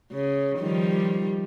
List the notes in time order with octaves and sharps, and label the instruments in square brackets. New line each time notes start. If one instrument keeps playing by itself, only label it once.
[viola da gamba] C#3
D#3 F3 G3